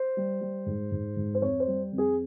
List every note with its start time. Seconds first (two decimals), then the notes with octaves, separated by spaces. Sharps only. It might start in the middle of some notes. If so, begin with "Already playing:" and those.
Already playing: C5
0.17 G3
0.41 G3
0.66 G#2
0.91 G#2
1.17 G#2
1.35 C5
1.41 F2 C#5
1.60 C5
1.67 G3
1.92 F2
1.98 G#4